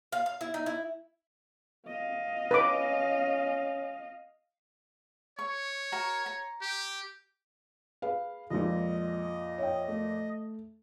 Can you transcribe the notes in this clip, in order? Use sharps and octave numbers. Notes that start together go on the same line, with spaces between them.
F5
F5
E4
D#4
E4
D#5 F5
C#4 B4 B5 D6
C#5 C#6
F#4 A#4 A#5
A#5
G4
G#4 B4 F5
F2 A#2 F3 G#3 D#5
C#5 E5 G5
A3